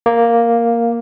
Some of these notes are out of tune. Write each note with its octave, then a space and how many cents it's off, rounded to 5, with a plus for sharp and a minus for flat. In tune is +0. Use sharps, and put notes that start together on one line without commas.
A#3 +0